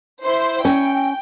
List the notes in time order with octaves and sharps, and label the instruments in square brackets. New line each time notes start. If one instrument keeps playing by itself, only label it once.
[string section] E4 C5
[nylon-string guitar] C#4 [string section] G5